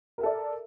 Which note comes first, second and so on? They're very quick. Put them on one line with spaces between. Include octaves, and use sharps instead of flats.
A#4 E5 A4 D5